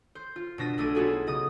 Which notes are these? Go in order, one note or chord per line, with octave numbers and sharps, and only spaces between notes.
C5
F4
B2 D4 A#6 B6 D#7
B1 A3 D4 D6 D#7
B3 D#4 F4 F#4 G#4 A4
C#3 D#5 D#6